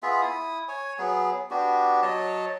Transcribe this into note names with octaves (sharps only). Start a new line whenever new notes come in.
B3 F4 G#4 E5
E4 D#6
C#5 G#5
F#3 B3 G#4
B3 D4 F#4 G4
F#3 C#5 D#5 A5